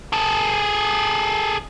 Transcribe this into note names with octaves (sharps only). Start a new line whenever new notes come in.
G#4 A4